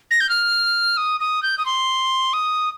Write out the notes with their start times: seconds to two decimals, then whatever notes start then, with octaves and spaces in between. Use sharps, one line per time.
0.11 A#6
0.21 G6
0.29 F6
0.97 D#6
1.20 D#6
1.43 G6
1.58 D#6
1.66 C6
2.33 D#6